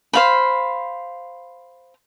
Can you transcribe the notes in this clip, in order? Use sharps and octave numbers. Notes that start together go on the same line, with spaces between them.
C5 F5 B5